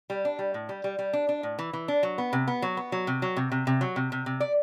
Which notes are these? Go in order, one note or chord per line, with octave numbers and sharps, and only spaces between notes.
G3
D4
G3
A2
G3
G3
G3
D4
D4
A2
E3
E3
D4
F#3
B3
C3
B3
F#3
B3
F#3
C3
F#3
C3
C3
C3
F#3
C3
C3
C3
D5